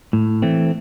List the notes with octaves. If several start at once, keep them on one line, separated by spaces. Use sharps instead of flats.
A2
E3 A3 C4